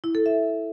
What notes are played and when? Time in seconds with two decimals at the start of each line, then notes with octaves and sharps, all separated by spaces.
0.04 E4
0.15 A4
0.26 E5